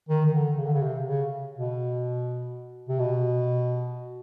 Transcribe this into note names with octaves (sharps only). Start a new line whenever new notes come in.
D#3
D#3
D3
C#3
D3
C#3
C3
C#3
B2
C3
B2